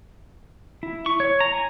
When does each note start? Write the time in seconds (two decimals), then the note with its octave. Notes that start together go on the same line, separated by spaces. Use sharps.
0.83 E4
1.06 C#6
1.20 C#5
1.40 A#5
1.54 G#5